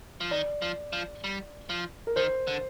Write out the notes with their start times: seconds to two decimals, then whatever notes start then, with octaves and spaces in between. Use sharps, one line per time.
0.21 F3
0.31 D#3 D5
0.62 F3
0.93 F3
1.24 G3
1.69 F3
2.07 A#4
2.16 D#3 C5
2.47 D3